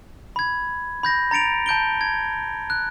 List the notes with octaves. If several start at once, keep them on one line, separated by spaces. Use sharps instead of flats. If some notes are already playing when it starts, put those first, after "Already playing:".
B5 G#6
B5 G6 A#6
A#5 A6 C#7 D7 F7
A5 G6 D7 G7
G#6
F#6